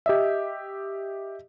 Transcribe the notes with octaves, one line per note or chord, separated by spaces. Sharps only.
G4 D#5 E5